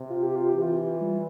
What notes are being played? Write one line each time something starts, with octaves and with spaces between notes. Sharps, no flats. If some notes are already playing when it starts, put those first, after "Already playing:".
Already playing: C3
F4
G4
F4
G4
E3
F4
G3